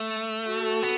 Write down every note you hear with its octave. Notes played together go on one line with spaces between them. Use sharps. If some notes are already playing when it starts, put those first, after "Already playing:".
Already playing: A3
F#4 A4
B3